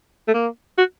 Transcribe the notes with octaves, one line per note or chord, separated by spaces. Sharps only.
A3
A#3
F#4